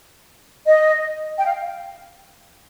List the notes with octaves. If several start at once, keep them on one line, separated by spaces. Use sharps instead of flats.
D#5
G5
F5